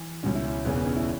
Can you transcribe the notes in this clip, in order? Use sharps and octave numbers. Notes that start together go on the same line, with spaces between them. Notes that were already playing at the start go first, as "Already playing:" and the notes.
Already playing: E3
C#2 B2 C#4
E4
C#4
E1 E2 C#3 E3 B3
B3
C#4
E4